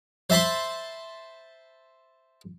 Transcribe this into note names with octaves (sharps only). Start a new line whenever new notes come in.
C5 E5 A5 B5 C6